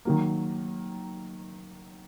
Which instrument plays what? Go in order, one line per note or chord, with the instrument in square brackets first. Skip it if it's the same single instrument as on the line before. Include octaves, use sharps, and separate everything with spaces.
[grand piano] D#3 F#3 A#3